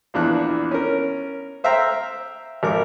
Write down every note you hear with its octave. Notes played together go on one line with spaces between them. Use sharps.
A#1 E2 D4 F#6
C#4 A#4
C5 E5 F5 G5 A#5
G#1 A#4 D6